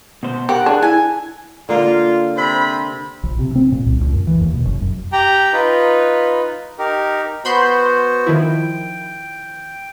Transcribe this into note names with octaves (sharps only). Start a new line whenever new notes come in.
B2 C5
G4 A#4 F#5
D4 G#4
E4 G#5
D3 A#3 F4
C3 C5 B5
A#1
C3
C4
A#2
C2
C#2
F#2
E3
D#2
B2
F#1
F#2
G4 G5 A#5
D#4 F4 B4
D#4 G4 A#4
B3 F#4 C5 B5 C6 G6
D#3 F3 E4
G5